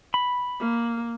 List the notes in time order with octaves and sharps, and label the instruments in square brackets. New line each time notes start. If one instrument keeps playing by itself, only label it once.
[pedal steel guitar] B5
[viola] A#3